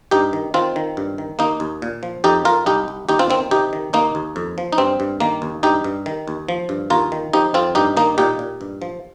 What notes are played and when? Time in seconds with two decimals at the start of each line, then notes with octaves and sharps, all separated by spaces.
0.11 G2 D#4 G4
0.33 D#3
0.54 D#3 C4 F4
0.76 D#3
0.97 G2
1.18 D#3
1.39 D#2 A#3 D#4
1.60 D#2
1.82 A#2
2.03 F3
2.24 F2 D#4 G4
2.45 F2 F4 A#4
2.66 C2 D#4 G4
2.88 C2
3.09 D#2 D#4 G4
3.19 C4 F4
3.30 D#3 C4
3.51 C3 D#4 G4
3.73 D#3
3.93 D#2 A#3 D#4
4.15 D#2
4.36 F2
4.58 F3
4.73 D#4
4.78 G2 C4
5.00 G2
5.20 D#3 A#3
5.42 D#2
5.63 G2 D#4 G4
5.84 G2
6.06 D#3
6.28 D#2
6.49 F3
6.69 G2
6.90 D#2 F4 A#4
7.12 D#3
7.33 F3 D#4 G4
7.54 F2 C4 F4
7.75 G2 D#4 G4
7.97 D#3 A#3 D#4
8.18 A#2 D#4 G4
8.39 A#2
8.61 G2
8.82 F3